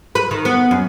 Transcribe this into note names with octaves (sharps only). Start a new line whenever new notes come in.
B4
D#3
B3
F#2